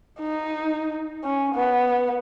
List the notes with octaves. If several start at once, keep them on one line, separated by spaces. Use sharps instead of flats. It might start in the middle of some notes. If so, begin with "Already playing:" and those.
D#4
C#4
B3